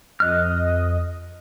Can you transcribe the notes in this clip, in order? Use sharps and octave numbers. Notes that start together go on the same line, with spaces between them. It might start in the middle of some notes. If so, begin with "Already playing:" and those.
F2 D#5 F6 F#6